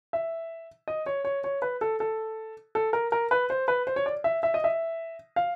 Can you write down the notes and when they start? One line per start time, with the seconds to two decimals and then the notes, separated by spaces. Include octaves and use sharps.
0.13 E5
0.88 D#5
1.06 C#5
1.25 C#5
1.44 C#5
1.62 B4
1.81 A4
2.00 A4
2.75 A4
2.93 A#4
3.12 A#4
3.31 B4
3.50 C5
3.68 B4
3.87 C5
3.96 C#5
4.06 D5
4.24 E5
4.43 E5
4.54 D#5
4.64 E5
5.36 F5